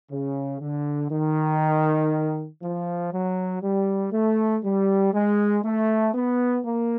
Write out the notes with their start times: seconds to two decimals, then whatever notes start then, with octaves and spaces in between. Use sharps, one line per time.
0.11 C#3
0.62 D3
1.11 D#3
2.63 F3
3.13 F#3
3.63 G3
4.13 A3
4.64 G3
5.14 G#3
5.65 A3
6.14 B3
6.65 A#3